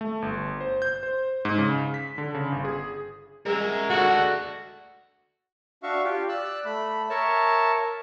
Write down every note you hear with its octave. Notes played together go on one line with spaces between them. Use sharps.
A3
G1
C5
G6
C5
G#2
C#3
B6
D3
C#3
G1
G#4
G#3 A#4 E5
A3 D4 F#4
D4 F#4 E5 F5 C#6
F4 G4
D5 E6 F#6
A3 B5
A#4 C#5 E5 A5